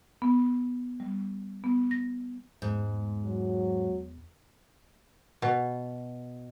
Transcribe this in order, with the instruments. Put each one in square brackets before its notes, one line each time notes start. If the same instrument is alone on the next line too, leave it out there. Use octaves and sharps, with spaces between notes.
[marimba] B3
G3
B3
A#6
[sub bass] E2 [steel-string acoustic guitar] G#2
[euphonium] F#3
[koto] B2